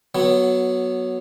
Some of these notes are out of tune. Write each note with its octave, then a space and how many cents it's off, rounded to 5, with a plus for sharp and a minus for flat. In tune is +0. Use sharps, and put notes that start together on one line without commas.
F#3 +0 B3 -15